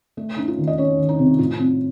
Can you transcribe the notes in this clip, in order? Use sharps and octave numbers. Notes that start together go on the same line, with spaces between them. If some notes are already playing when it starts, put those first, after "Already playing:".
A3
C#4 D#4
F4
D#3
D#5
C#4 C#5
D#3
D#4
C3
A2 F4
C4